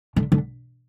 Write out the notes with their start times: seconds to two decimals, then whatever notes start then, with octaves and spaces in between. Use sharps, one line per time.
0.16 D3
0.32 D3